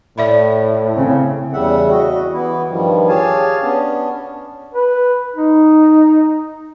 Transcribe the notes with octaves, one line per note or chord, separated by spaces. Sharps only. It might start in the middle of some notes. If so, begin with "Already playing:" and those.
A2 D5 E5 B5
C#3 C4
E2 C#3 G3 E5 F#5
F#4 D#5
E3 B3 E4
G2 D#3 F3 G3
G4 G#4 C#5 F5 G#5 A5
B3 C#4 D4
B4
D#4